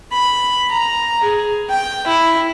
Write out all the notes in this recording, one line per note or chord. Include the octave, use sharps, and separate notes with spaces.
B5
A#5
G#4
G5
E4